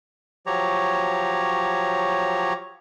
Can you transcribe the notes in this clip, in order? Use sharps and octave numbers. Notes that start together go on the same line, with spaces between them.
F3 F#3 G4 C#5 A#5